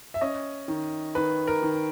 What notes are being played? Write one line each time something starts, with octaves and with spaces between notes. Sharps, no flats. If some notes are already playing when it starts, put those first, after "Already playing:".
E5
C#4 D#5
D#3
D#3 B4
A#4
D#3